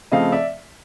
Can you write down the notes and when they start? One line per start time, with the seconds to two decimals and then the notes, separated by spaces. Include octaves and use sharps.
0.12 C#3 F3 A3 C4 D#5 F5
0.32 D5 E5